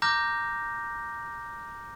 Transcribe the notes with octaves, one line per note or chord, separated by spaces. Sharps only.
A#5 D6 F6 G6 A#6